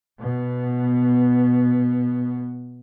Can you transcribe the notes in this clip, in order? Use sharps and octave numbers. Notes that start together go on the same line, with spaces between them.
B2 B3